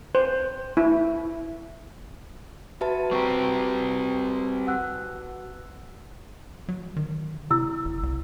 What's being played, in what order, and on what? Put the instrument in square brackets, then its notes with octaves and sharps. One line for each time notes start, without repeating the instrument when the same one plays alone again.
[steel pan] C5
E4
[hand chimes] F#4 B4 A5 [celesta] E5
[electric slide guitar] G3 C4 G4 [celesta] A#5 C#6
[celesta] F#5 E6 F#6
[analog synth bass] F#3
D#3
[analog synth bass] C3 [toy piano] E4 E6
[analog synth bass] F#1
C2